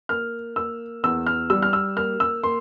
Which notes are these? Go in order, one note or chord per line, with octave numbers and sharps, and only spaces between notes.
A#3 F6
A#3 E6
E2 E6
F6
G3 E6
F6
E6
A#3 F6
E6
A#3 C6